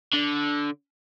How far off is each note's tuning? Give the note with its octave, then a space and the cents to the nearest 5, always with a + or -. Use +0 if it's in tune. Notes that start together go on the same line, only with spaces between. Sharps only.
D3 -10